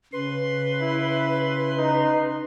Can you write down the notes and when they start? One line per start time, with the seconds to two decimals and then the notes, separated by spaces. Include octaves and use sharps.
0.13 C#3 B4 C6
0.81 E4
1.77 D#4